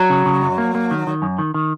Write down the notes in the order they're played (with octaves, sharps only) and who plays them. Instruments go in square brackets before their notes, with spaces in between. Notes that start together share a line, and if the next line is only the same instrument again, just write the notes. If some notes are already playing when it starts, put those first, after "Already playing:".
Already playing: [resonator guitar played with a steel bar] F#3
[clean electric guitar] C#3
C#3
F#2
A#3
A#3
D#3
D#3
F#2
D#3
D#3